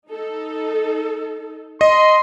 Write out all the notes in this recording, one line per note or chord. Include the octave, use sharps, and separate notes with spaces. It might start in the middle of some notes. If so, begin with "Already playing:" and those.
D#4 A4
D#5 C6